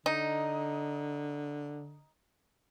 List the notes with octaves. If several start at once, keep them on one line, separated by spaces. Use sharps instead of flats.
D3 D#4